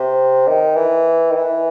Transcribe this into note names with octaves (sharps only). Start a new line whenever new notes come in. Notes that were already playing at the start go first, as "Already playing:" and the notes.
Already playing: C3
D#3
E3
D#3
E3